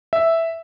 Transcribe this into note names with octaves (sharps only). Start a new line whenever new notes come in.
E5